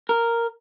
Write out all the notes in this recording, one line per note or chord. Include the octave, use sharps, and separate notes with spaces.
A#4